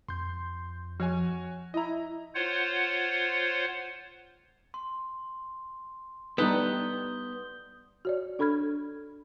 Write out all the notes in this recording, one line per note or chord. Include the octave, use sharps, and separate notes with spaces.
F2 C6 G6
F3 F#4 C#5 G#5
E4 D#5 A#5
F4 C5 C#5 F#5
C6
G3 B3 D#4 A4 D#6 G6 G7
F#4 C#5 D5
D4 A4 B5 F6 G#6